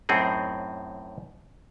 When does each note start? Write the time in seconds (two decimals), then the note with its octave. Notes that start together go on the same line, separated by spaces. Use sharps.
0.09 F#2 A2 C4 D#4 G#4